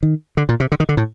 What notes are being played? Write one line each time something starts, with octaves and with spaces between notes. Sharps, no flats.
D#3
D3
A#2
C3
D3
D#3
D3
A2